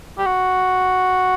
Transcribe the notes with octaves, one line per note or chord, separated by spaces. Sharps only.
G4
F#4